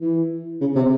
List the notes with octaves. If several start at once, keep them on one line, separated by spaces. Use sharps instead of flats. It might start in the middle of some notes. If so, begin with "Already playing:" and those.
E3
C#3
C3